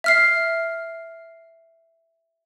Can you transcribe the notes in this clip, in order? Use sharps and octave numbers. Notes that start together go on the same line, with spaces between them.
E5 F6 C7